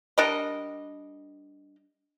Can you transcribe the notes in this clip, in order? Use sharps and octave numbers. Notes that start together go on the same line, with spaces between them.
G3 D4 A#4 D#5